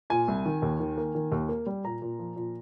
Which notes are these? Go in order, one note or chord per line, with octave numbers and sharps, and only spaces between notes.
A#2 G#5
C2
D#3
D#2
D#3
A#3
D#3
D#2
A#3
G3
A#2 A#5
A#2
F3
A#2